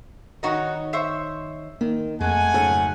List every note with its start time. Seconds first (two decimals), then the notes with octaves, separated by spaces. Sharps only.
0.43 D#3 D#4 F#4 B4 C#5 D#5
0.93 C5 E5 C#6
1.81 D#3 A#3
2.21 F2 G#3 A3 F#5 G#5
2.54 G#2 C#3 F#3 A4